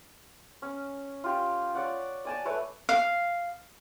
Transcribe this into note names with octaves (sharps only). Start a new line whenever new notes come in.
C#4
F4 G4
C#5 D5 F#5
D5 G#5 A5
A3 B4 C#5 A5
F5